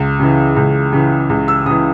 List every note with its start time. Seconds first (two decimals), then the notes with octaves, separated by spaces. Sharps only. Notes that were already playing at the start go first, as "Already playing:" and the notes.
Already playing: C#2
0.20 C#3 E3
0.56 C#2
0.93 C#3 E3
1.30 C#2
1.48 E6
1.66 C#3 E3 D#6